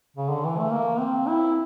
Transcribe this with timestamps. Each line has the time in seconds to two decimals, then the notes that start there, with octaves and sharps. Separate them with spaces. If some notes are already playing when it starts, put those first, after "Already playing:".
0.17 C#3
0.30 D3
0.45 E3
0.58 A3
0.71 A#3
1.00 C4
1.27 E4